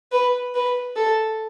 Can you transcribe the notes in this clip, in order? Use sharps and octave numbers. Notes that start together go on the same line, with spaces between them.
B4
B4
A4